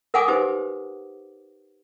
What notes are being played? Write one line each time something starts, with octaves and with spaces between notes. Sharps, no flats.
A#4 F5 F#5 G#5 D6 D#6
D#4 G4 B4 C5